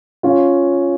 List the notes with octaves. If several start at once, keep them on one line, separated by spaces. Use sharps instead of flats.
C#4 F4